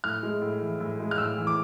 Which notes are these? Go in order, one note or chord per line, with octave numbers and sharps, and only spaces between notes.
A2 F6
G#3
A2
E3
A2
G#3
F6
A2 E6
E3
D6